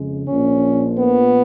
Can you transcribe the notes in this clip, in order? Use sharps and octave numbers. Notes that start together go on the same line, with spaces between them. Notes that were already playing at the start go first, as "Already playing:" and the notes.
Already playing: F2 C#3 G#3
A#1 A#2 F3 C#4
B3